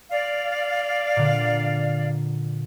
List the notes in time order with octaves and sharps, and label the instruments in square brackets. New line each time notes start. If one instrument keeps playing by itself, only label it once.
[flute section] D5 F5
[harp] A#2 D3